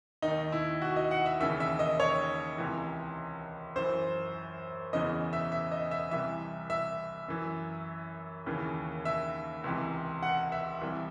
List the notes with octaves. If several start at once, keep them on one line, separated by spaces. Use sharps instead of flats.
D#2 D#3 D#4
E4
F#4
D#5
F#5
E5
D#2 C#3 E3 E5
E5
D#5
C#5
C#2 C3 E3
F#2 E3 C5
E2 C#3 E3 D#5
E5
E5
D#5
E5
C2 C3 E3 E5
E5
F#2 E3
D#2 C#3 E3
E5
C#2 C3 E3
F#5
E5
C2 C3 E3